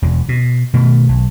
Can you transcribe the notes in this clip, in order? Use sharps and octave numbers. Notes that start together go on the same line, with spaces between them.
E1 E2
B2
B2 D#3 A3
B1